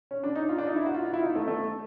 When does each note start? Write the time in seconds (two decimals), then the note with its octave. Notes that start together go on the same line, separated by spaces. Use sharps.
0.11 C#4
0.24 D4
0.36 D#4
0.49 F4
0.58 D4
0.67 D#4
0.76 E4
0.86 F#4
0.94 F4
1.05 F4
1.13 E4
1.23 D#4
1.35 A3
1.48 A3